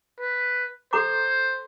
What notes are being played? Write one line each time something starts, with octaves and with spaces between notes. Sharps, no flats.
B4
A4 C5 A#5 D6